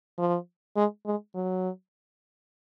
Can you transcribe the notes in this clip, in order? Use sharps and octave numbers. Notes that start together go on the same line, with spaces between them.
F3
G#3
G#3
F#3